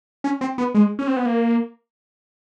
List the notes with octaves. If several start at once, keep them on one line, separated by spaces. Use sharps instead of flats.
C#4
C4
B3
G#3
C#4
C4
B3
A#3